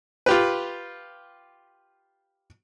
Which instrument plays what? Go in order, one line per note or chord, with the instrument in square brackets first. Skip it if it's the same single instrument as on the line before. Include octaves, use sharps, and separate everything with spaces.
[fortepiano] F4 G4 B4